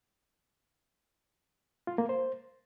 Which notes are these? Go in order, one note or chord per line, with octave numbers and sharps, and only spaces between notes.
F4
A#3
C5